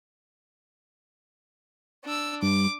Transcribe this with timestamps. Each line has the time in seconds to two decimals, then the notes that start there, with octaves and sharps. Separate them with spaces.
2.04 D4 E6
2.42 G2 D6